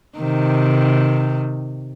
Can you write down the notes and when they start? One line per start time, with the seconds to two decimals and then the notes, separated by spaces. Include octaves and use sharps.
0.19 C3 D#3